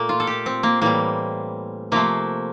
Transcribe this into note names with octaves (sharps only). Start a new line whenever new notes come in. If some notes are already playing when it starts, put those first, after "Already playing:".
Already playing: A#2 A3 A#3
F4
A4
G4
C4
A#3
A2 E3 G3 A#3
C3 F3 A3 A#3